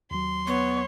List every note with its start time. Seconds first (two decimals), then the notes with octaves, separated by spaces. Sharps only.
0.11 D#2 F#3 C6
0.47 B3 C#5